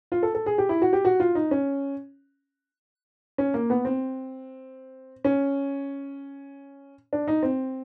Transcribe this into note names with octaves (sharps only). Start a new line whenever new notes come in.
F4
A4
A4
G#4
G4
E4
F#4
G4
F#4
F4
D#4
C#4
C#4
A#3
B3
C4
C#4
D4
D#4
C4